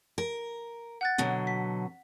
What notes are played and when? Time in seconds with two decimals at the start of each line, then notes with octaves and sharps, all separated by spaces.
0.18 A#4
1.01 F#5 F#6 A6
1.18 B2 D3 F#3
1.47 B6